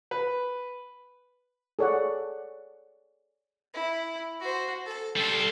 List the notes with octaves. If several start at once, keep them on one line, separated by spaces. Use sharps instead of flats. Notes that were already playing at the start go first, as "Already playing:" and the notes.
B4
G#4 A4 C#5 D5 F#5
E4
F#4 C5
A4
G3 A4 C5